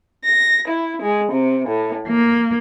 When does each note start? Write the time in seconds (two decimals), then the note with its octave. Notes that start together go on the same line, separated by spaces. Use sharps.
0.25 A#6
0.68 E4
1.01 G#3
1.33 C3
1.68 A2
2.07 A#3